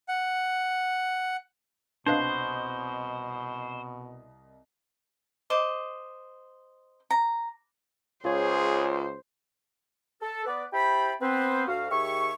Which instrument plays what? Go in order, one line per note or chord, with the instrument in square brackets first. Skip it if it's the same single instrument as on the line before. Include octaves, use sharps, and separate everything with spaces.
[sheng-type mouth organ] F#5
[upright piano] C2 D#5 F#6 [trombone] B2 [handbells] D4 B4 F5 [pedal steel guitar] C5
[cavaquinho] C5 D#5 D6
A#5
[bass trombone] C#2 [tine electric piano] F4 C#5 [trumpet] G#4 [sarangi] C5
[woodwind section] A4
B3 B4 D5
E4 G4 C5 G5 A5 B5
B3 C4 B4 C5
D2 F#4 F5
D#2 G4 G#4 E5 C#6